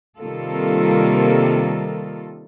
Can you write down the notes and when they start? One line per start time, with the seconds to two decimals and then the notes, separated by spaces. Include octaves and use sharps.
0.19 C3 D#3 G3 A#3 F4 A4